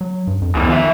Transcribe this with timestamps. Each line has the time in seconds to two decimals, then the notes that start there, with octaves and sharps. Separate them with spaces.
0.01 F#3
0.27 G2
0.42 F2
0.55 D2 B2 E3
0.69 D#3 F3 E5